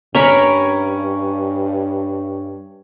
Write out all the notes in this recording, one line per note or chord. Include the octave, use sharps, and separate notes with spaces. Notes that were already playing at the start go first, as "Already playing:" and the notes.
G2 C#4 A#4 C#5 B5